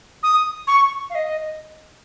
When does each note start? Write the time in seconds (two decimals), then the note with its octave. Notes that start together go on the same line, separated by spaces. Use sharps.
0.23 D#6
0.67 C#6
1.10 F5
1.15 D#5